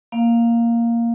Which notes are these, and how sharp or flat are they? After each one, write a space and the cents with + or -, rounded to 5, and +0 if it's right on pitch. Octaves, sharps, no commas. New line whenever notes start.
A#3 +0 F5 +5